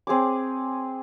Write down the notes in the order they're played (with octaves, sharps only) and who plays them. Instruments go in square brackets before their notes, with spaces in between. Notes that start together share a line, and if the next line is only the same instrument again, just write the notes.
[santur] C4 G#4 C#5 D6